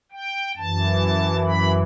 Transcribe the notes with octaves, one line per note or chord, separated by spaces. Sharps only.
G5
F#2 E3 A5
B5